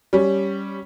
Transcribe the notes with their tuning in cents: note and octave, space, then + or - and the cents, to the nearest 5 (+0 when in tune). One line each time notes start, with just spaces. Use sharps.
G3 +0 C#4 +0